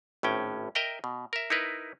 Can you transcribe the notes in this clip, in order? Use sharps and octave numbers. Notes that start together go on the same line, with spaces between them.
G#1 A2 C#4 G5
A#4 D#5 E5 G5 A#5
B2
A#4 E5
D#4 E4 A#4 B4